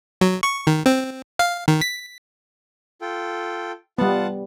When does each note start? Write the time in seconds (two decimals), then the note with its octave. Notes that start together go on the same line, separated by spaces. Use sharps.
0.21 F#3
0.43 C#6
0.67 D#3
0.86 C4
1.39 F5
1.68 D#3
1.81 B6
3.01 F4 A4 G5
3.98 G3 B3 F4 F#5 A5